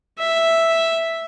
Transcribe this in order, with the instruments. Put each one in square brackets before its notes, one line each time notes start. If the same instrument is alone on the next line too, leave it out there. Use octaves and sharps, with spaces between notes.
[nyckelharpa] E5